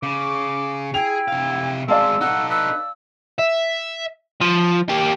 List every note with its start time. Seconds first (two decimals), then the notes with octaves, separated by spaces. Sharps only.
0.03 C#3 D6
0.94 E4 G#4 G5 F7
1.28 C3 F5
1.88 G#3 C4 D5 F5 A5 E6
2.21 D#4 A4 F#5 E6
2.50 B4 E6
3.38 E5
4.41 F3
4.89 A#3 G4